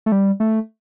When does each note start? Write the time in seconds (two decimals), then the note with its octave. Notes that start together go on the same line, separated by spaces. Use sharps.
0.06 A3
0.12 G3
0.40 A3